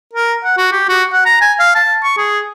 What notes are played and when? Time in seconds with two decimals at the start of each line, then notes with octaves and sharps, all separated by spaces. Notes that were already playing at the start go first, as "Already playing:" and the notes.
0.13 A#4
0.44 F#5
0.57 F#4
0.72 G4
0.89 F#4
1.13 F#5
1.26 A#5
1.41 G#5
1.60 F5
1.75 A5
2.04 C#6
2.18 G#4